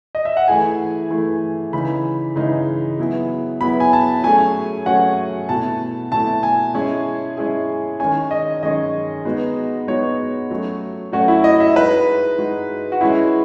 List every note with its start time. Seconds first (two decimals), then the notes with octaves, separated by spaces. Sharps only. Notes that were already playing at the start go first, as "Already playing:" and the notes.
0.15 D#5
0.25 E5
0.37 F#5
0.48 E3 A3 E4 G#4 G#5
1.10 E3 A3 E4 G#4
1.73 C#3 E3 G#3 D#4 B5
2.36 C#3 E3 G#3 D#4
2.99 F#3 B3 E4 G#4
3.61 F#3 B3 E4 G#4 B5
3.80 G#5
3.93 A5
4.23 F#3 A3 C#4 G#4 G#5
4.86 F#3 A3 C#4 G#4 F#5
5.49 B2 A3 E4 A5
6.12 B2 A3 E4 A5
6.43 G#5
6.74 G#3 C#4 E4 G#4
7.37 G#3 C#4 E4 G#4
8.00 D#3 G#3 C#4 G#5
8.31 D#5
8.63 D#3 G#3 C#4 D#5
9.25 G#3 B3 D#4 F#4
9.87 G#3 B3 D#4 F#4 C#5
10.51 F#3 A3 C#4
11.13 F#3 A3 C#4 F#4
11.28 E4
11.44 D#5
11.60 E5
11.76 G#3 D#4 F#4 B4
12.38 G#3 D#4 F#4
12.92 F#4
13.01 G#3 C#4 E4 G#4